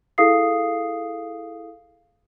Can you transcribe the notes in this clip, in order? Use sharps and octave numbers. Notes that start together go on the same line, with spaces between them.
E4 G#4 A4 F5 D#6 C7